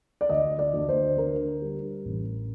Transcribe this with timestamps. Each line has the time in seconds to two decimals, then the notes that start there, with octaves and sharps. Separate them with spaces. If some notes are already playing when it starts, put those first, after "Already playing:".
0.21 D5
0.29 D2 D#5
0.59 D5
0.74 D2
0.89 C5
1.17 D3 A#4
1.62 G3
2.05 A1